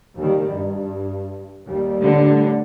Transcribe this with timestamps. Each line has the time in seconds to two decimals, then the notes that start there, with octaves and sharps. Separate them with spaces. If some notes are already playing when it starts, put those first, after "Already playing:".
0.18 D#2 D#3 G3
0.49 G2
1.66 D#2 G3
1.99 A2 D3